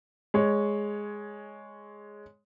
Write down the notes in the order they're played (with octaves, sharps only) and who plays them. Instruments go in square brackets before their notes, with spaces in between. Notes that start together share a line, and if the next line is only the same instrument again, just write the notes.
[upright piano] G#3 C#5